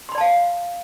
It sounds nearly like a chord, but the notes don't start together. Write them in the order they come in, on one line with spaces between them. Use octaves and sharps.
C6 B5 D5 A5 F5